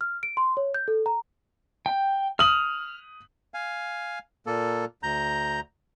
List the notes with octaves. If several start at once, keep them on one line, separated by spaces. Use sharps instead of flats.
F6
D7
C6
C#5
G6
A4
A#5
G5
D#6 F6 F#7
F5 G#5
A#2 A#3 A4
D2 A#5 G6